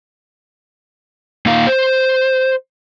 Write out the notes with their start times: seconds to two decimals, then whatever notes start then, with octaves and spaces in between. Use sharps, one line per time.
1.46 A#3 D#4 F4 F5
1.67 C5